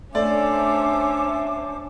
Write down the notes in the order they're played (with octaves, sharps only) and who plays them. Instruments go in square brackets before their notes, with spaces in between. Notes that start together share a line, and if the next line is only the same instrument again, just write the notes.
[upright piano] A3 D5 [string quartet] C#4 D4 [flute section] C5 D6 [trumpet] E5